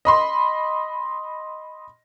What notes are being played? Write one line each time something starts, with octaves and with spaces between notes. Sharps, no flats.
D#5 B5 C6